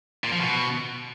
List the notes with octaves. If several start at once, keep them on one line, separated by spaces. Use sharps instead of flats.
A#2
F3
B2